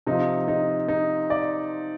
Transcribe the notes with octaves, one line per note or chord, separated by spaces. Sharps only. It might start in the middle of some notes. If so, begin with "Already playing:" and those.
C3 F3 D#4
D#4
D#4
D5